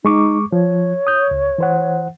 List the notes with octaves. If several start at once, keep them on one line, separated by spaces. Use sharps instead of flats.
G#3 D#4 C#6 D6
F3 C#5
D#6 G6
C#2
E3 C5 F#5